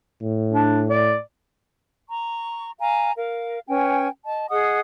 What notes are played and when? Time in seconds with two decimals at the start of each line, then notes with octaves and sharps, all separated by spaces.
0.22 A2
0.53 D4
0.89 D5
2.09 A#5 C#6
2.80 F5 G#5 A#5
3.16 A#4 F5
3.68 C#4 B4 G5 G#5
4.25 D#5 A5
4.50 G#4 D#5 F#5 D#6